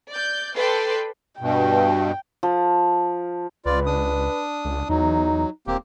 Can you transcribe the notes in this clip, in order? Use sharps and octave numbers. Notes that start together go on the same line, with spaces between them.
D5 G6
A4 B4 D5 G5 C6
G2 B2 G5
F3
C#2 F4 B4 D5
D4 D#6
C#2
E2 F#3 D#4
D#1 A#3 C4 G4